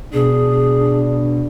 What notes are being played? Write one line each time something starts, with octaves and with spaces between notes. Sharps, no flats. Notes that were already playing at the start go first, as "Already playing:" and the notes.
B2 D4 G#4